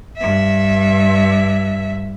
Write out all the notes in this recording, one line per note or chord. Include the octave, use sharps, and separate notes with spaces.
G2 E5